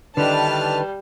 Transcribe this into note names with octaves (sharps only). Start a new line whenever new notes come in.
D3 D#3 G3 D4 E4 B4 A5 F6